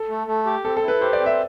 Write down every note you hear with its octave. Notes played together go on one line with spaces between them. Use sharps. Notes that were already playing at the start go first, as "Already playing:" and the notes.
Already playing: A4
A3
A3
G4
C4 A4
A4
E4
B4
G4 C5
D5
C4
E5